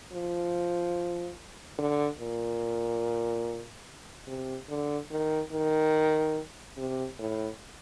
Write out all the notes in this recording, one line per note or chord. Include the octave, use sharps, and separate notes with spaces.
F3
D3
A#2
C3
D3
D#3
D#3
C3
A2